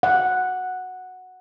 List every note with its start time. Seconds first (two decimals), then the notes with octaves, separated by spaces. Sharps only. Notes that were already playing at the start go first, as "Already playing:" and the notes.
0.03 F#5